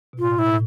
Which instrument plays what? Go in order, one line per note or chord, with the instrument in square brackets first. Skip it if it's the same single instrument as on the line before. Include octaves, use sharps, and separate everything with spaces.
[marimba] B2
[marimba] A2 [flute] F4
[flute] E4
[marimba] A2